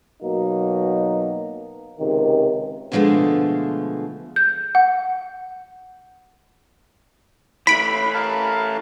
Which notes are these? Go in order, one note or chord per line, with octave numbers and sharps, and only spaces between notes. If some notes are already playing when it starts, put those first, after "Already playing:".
B2 F#3 A#3 D#4
C#2 C3 D#3
B2 D3 F3 F#3 G#3 A3
G6
F#5
E3 A3 B5 B6 D7
A#4 F5 A5